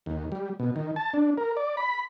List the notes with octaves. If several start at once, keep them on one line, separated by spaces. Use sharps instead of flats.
D#2
G3
B2
D#3
A5
D4
A#4
D5
B5